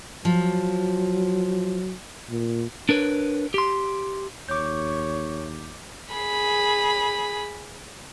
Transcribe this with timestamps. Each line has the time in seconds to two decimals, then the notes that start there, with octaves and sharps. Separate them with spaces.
0.25 F3 F#3
2.30 A#2
2.89 D4 A#4 B4 C#5
3.54 G4 C6
4.49 D#2 C#5 D6 G6
6.14 G#4 B5